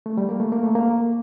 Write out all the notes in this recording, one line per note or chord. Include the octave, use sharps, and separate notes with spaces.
A3
G3
A#3
A3
A#3
A3
A#3